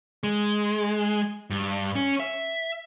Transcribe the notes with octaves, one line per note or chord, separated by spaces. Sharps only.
G#3
G2
C#4
E5